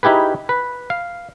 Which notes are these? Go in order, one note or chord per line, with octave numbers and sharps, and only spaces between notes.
D#4 E4 G4 G#4 B4
B4
F5